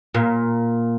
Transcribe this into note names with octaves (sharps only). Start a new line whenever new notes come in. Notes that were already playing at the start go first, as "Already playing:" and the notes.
A#2